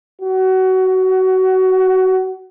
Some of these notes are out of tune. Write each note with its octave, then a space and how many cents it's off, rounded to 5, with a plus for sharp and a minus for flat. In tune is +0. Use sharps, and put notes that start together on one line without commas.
F#4 +20